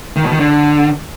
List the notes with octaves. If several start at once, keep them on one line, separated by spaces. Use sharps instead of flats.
D#3
B2
D#3
D3